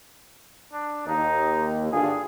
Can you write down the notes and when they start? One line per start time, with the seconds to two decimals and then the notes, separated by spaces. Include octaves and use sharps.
0.73 D4
1.07 D#2 D#4
1.93 G2 D3 F4 G#4